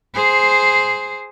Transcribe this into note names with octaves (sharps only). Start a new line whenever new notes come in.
G#4 C5